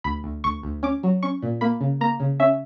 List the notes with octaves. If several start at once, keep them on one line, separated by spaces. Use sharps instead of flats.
D2 B5
D2
D2 C#6
D2
C#4 D6
F#3
C#4 C#6
A#2
A#3 B5
C#3
A#3 A#5
C#3
C#4 E5